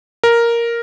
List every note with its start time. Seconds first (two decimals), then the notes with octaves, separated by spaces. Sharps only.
0.24 A#4